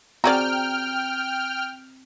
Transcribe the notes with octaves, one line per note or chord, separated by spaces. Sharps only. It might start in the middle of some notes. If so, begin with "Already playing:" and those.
C4 F#4 G#4 D5 G5 A#5 F6